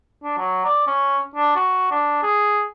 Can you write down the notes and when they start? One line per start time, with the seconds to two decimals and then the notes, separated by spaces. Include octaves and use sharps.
0.23 D4
0.38 F#3
0.65 D5
0.87 C#4
1.35 D4
1.55 F#4
1.91 D4
2.23 G#4